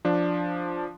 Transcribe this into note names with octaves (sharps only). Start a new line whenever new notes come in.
F3 D4